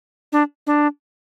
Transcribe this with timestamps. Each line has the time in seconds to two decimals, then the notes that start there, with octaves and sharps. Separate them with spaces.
0.32 D4
0.67 D4